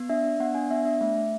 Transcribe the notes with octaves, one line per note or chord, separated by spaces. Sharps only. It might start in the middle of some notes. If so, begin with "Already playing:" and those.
Already playing: B3
D4 E5
D4
B3 F#5
D4 G#5
B3 E5
D4 E5
A3 E5
A3